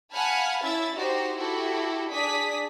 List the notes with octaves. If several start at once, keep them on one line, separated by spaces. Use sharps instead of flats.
F5 F#5 G#5 A5 B5 F6
C#4 E4 E5 A6
D#4 F#4 G4 C5
E4 F#4 G4 A4
D4 G#4 D5 D#6 B6